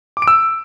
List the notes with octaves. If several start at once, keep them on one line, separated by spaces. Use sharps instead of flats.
D6
D7
E6